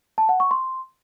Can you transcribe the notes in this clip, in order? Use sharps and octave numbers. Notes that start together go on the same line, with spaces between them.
A5
F#5
C#6
C6